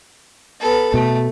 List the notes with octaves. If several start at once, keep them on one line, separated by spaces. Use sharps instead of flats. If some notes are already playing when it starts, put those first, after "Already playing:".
B3 A4
B2 A3